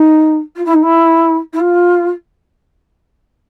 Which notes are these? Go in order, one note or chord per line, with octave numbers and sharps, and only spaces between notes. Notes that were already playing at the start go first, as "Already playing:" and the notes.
Already playing: D#4
F4
E4
D#4
E4
E4
F4